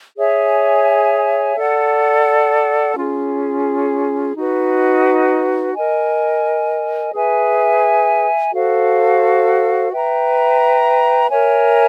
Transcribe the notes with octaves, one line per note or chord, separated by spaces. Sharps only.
G#4 C#5 E5 G#5
A4 D5 F#5
C#4 F4 G#4
D#4 F#4 B4
A#4 D#5 G#5
G#4 B4 E5 G#5
F#4 A4 C5 F5
B4 E5 G5 A#5
A#4 C#5 E5 G#5